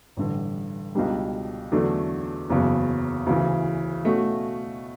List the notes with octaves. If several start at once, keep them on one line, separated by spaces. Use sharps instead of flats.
A1 G2 D3
C#2 B2 G3 D4
E2 D3 F#3 A3 D4
F#1 E2 C#3 F#3 B3
D2 C#3 E3
B2 A3 C#4 F#4